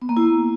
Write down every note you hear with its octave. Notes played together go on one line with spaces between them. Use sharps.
B3
A#3
E4